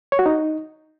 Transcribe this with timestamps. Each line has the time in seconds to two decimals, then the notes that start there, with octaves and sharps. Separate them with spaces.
0.12 C#5
0.19 F#4
0.26 D#4